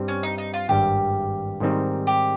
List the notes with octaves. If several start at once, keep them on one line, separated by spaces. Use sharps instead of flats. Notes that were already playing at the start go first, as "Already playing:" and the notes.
Already playing: G2 G3 C4
C#4
D#4
D#4
F4
G#1 G2 G3 G4
G#2 D#3 G3 C4 D#4
G4